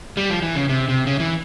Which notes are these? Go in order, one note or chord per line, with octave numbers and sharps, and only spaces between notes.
G3
F3
E3
C#3
C3
C3
C#3
E3